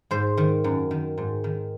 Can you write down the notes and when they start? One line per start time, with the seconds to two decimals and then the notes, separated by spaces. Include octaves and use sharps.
0.11 G#2 C5
0.37 D#3
0.64 F#2
0.91 D#3
1.18 G#2
1.44 D#3